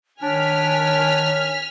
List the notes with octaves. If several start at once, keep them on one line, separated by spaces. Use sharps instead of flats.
D#3 D4 C#5 G#5 F6 B6